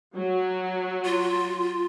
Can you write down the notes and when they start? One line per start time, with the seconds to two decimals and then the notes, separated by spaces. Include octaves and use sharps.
0.16 F#3
1.05 F4